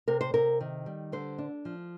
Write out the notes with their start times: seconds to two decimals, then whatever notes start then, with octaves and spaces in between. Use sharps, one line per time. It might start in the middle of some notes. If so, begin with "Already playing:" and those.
0.08 C3 A#4
0.21 C5
0.34 C3 A#4
0.61 D#3
0.86 G3
1.12 D3 C5
1.38 D4
1.65 F3